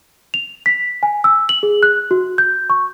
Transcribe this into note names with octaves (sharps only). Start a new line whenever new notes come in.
F7
B6
G#5
E6
F#7
G#4
F#6
F#4
G6
C#6